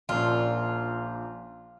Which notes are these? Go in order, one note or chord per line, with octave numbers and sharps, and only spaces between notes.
A#1 A#2 C#4 D4 F4